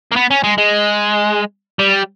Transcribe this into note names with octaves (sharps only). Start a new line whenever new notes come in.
A#3
B3
C#4
G#3
G#3
G3